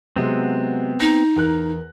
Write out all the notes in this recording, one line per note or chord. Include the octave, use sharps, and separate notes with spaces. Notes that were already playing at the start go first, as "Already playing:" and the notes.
C3 F#3 G#3 B3 C4
D#4 A#6
E2 A#4 F#6